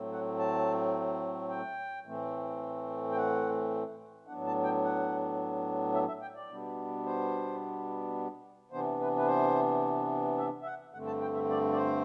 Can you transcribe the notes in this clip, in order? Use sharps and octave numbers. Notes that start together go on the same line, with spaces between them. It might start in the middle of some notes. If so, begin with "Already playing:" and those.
Already playing: A2 F#3 A3 C4
F#5
A5
G5
A2 E3 A3 C4
G5
F#5
A2 F#3 B3 D4 F#5
A5
G5
F#5
E5
E5
G5
D5
B2 G3 B3 D4
C5
C3 E3 B3 D4 C5
B4
B4
C5
E5
E5
F#5
G2 D3 A3 C4 F#5
A5
G5
E5
D5
D5
C5